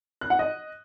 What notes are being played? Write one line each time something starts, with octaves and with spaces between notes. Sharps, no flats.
F#6
F#5
D#5